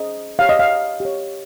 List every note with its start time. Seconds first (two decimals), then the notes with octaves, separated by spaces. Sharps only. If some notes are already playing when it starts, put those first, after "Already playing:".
Already playing: C#4 G#4 C5 D#5
0.39 G4 C#5 F5
0.49 D#5
0.59 F5
1.00 G4 C#5